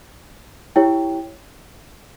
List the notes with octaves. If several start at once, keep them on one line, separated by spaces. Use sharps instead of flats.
E4 G4 C#5 G5